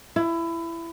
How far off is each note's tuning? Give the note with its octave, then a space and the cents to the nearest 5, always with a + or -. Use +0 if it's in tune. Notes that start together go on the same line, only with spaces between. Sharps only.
E4 +20